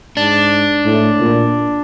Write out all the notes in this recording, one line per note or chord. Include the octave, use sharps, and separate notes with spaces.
G#2 D4
A2
A#2